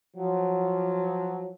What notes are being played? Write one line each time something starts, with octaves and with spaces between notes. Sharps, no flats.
F3 F#3